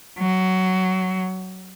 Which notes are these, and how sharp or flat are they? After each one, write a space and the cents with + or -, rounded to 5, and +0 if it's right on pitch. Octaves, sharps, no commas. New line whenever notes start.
F#3 +15